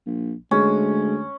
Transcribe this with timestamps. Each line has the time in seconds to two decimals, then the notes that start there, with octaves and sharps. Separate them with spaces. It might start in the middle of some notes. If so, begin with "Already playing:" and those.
0.06 A#1
0.51 D2 G#3 C#4